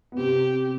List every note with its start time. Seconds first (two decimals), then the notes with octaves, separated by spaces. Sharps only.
0.12 B3
0.17 C3 C4 G4